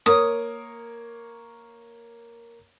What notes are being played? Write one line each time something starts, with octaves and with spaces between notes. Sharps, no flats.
A#3 A#4 C#5 D#6